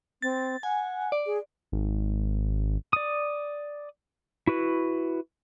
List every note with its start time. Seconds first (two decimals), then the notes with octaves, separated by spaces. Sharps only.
0.22 C4 A6
0.63 F#5 G#5
1.12 D5
1.26 G#4
1.72 G#1
2.93 D5 D#6
4.47 E4 F#4 B4